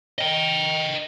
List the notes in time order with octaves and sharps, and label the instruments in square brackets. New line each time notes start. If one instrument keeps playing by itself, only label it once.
[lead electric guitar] D#5 G5